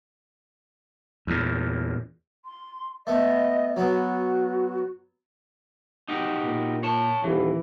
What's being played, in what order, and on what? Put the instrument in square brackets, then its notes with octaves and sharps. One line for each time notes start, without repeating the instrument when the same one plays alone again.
[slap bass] E2 A#2
[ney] C6
[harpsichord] A3 B3 [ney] D#5
[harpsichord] F#3 B3 [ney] F#4
[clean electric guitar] D#4 F#4 G4
[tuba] A#2
[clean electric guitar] C#5 A5
[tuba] D#1 [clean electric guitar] E3